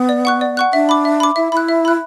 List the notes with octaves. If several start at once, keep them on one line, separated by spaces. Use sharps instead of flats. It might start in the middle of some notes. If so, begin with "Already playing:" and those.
Already playing: B3
D5
F#5 C#6 F#6
D5
F#5 C#6 F#6
D4 E5
B5 D6
E5
B5 D6
E4 E5
E4 B5 F#6
E5
B5 F#6